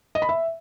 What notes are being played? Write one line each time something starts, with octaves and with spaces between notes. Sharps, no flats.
D#5
B5
E5